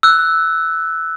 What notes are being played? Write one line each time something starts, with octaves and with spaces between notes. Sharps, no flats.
E6 F#6